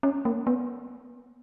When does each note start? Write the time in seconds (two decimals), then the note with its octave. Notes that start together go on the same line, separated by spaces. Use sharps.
0.03 C#4
0.25 A#3
0.47 B3